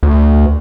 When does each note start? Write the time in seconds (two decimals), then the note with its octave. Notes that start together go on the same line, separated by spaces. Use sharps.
0.03 D2